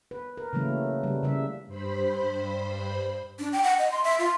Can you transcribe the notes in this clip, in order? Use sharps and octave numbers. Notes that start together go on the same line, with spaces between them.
B4
A#4
C#3 E3 F#3 A3 A#3
C#3 G3
C#3 G3 E5
G2 C5 B5
D4
G5
F#5
D#5
C6
E5
F4